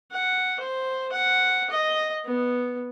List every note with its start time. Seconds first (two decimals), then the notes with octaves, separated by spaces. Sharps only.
0.12 F#5
0.60 C5
1.12 F#5
1.70 D#5
2.25 B3